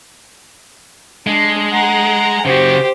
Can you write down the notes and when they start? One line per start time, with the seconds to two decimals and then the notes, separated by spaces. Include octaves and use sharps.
1.27 G#3 D4
1.73 F#5 A#5
2.46 C#3 F#4 G4 C5